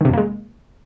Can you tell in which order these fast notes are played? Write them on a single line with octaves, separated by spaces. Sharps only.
D#3 C3 F#2 A#3 G#3